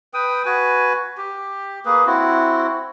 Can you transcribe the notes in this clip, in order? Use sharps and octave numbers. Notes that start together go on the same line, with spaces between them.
B4 G5 D#6
F#4 B4 G#5
G4
A#3 G#4 B4
C4 E4 F#4